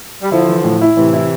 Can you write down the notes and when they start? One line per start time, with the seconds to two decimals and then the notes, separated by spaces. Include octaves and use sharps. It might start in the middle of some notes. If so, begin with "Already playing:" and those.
0.22 G3
0.31 D3 F3 E4
0.49 E3
0.64 A2
0.81 E4
0.97 A2 C3 E3
1.13 E4